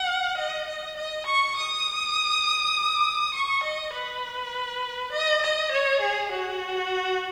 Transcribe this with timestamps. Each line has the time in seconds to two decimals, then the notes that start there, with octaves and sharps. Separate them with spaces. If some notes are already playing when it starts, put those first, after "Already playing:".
Already playing: F#5
0.37 D#5
0.68 D#5
0.96 D#5
1.26 C#6
1.56 D#6
3.34 C#6
3.64 D#5
3.93 B4
5.12 D#5
5.42 D#5
5.71 C#5
6.01 G#4
6.31 F#4